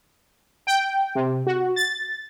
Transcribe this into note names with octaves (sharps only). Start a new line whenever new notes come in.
G5
C3
F#4
A6